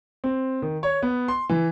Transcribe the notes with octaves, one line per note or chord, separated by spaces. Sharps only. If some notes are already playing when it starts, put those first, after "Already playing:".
C4
D#3
C#5
B3
C6
E3